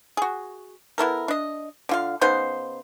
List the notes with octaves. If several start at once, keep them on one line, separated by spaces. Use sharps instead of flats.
F#4 G#4
B3 E4 A4 A#4
D4 D#5
D3 F4 F5
C#3 B3 D#4 C5